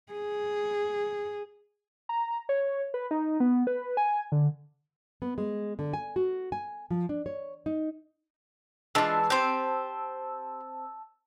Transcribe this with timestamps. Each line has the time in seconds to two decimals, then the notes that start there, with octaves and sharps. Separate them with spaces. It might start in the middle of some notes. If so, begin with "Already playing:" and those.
0.12 G#4
2.09 A#5
2.49 C#5
2.94 B4
3.11 D#4
3.40 B3
3.67 B4
3.97 G#5
4.32 D3
5.22 B3
5.38 G#3
5.79 D3
5.94 G#5
6.16 F#4
6.52 G#5
6.91 F3
7.09 D4
7.26 C#5
7.66 D#4
8.95 E3 G#3 D4 F4 A5 E6
9.30 C4 G4 C5